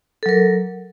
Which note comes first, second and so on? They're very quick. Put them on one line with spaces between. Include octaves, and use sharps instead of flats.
A4 F#3 A#4